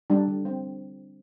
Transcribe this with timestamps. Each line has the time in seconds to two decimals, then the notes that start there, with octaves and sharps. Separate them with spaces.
0.10 G3 D4
0.28 D3
0.45 C4